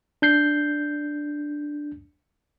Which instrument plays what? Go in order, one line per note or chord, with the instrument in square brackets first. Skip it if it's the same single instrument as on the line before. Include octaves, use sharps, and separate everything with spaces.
[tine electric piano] D4 G6 C7